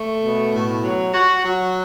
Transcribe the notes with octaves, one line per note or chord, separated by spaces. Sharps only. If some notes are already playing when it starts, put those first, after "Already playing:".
Already playing: A3
B2
A2
F#3
F#4
F#3